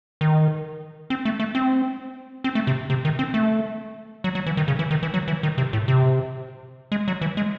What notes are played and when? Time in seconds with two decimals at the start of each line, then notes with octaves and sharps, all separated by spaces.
0.21 D#3
1.10 C4
1.25 A3
1.40 A3
1.55 C4
2.44 C4
2.55 A3
2.67 C3
2.90 C3
3.05 D#3
3.19 C4
3.34 A3
4.24 F#3
4.35 F#3
4.46 E3
4.57 D#3
4.68 C#3
4.79 E3
4.91 D#3
5.03 E3
5.14 F#3
5.28 E3
5.43 D#3
5.58 C3
5.73 A2
5.88 C3
6.92 G#3
7.08 F#3
7.21 E3
7.37 G#3